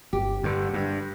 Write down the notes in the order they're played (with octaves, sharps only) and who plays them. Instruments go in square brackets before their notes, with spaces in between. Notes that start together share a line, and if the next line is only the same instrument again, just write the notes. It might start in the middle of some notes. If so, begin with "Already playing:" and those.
[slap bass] G1 [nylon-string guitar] G4
[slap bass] G2 D3
G2